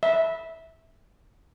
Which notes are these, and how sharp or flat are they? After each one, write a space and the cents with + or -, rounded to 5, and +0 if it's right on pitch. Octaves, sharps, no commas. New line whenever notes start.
E5 -10